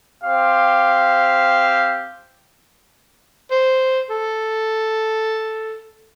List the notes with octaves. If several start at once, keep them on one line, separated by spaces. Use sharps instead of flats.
C4 G4 C5 F5
C5
A4